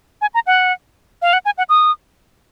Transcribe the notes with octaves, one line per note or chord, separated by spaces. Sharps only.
G#5
A#5
F#5
F5
F#5
G#5
F#5
D#6